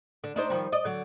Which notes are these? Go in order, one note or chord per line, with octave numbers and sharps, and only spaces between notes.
D3
D4 D#4 C5
D#3 F3 G3
D5 D#5
D3 F#3